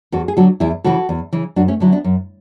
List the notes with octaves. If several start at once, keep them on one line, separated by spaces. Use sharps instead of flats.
E2 F#4 A4
G#4
D3 F#3 F#4 A4
E2 E4 G#4
C#3 E3 F#4 A4
E2
C#3 E3
F#2 D4 F#4
A3 C#4
D3 F#3 E4
B3 D4
F#2